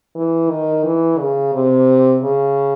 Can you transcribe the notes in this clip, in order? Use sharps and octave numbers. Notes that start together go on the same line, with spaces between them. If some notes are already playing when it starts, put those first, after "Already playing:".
E3
D#3
E3
C#3
C3
C#3